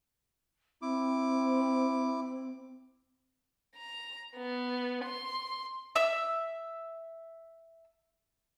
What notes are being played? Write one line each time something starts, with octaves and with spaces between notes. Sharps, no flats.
C4 E4 D6
A#5
B3
C6
E5 E6